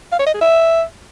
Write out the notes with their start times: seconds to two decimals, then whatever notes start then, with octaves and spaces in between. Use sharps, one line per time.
0.12 F5
0.19 C#5
0.27 D#5
0.34 G#4
0.41 E5